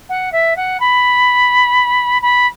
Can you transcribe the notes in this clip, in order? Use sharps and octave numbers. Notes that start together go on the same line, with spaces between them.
F#5
E5
F#5
B5
B5